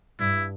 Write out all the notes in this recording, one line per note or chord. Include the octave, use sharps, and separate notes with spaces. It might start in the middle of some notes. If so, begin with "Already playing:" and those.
G2 E4